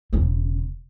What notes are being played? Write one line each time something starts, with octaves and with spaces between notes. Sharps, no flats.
E1 C#3